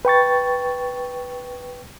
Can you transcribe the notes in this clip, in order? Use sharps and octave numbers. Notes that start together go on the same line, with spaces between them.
B4 G5 C#6 A6